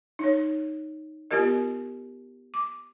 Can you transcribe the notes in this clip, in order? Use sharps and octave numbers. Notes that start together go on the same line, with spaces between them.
D#4 C#5
B3 F4 G4 A#4 D#5
D6